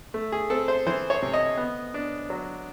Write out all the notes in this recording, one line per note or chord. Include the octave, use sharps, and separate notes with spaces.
A3
G#4
C4 A4
C5
E3 C5
C#5
C3
D#5
B3
D4
F#3